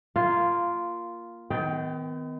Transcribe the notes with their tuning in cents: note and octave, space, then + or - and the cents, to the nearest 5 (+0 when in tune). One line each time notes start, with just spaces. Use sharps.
A#3 +0 F4 -10
D#3 +20 B3 +45 G5 +0